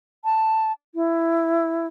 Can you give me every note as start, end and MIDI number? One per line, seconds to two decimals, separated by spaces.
0.24 0.72 81
0.95 1.87 64